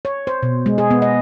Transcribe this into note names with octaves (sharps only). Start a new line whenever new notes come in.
C#5
C5
B2
G#3
G#4
B3
D#5